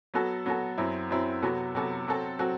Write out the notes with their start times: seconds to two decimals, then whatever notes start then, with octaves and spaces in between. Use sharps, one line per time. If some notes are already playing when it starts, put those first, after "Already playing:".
0.14 F#3 B3 F#4 A4
0.46 F#3 B3 F#4 A4
0.78 F#2 F#3 C4 E4
1.10 F#2 F#3 C4 E4
1.42 C3 F#3 B3 F#4 A4
1.75 C3 F#3 B3 F#4 A4
2.08 F#3 C4 F#4 A4
2.39 F#3 C4 F#4 A4